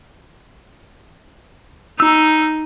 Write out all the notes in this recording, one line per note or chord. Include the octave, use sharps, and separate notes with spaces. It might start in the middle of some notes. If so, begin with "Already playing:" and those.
D#4 E6